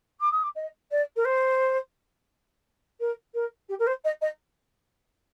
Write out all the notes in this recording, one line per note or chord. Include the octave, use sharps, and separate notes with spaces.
D6
D#6
D6
D#5
D5
A#4
C5
A#4
A#4
G4
A#4
C5
D#5
D#5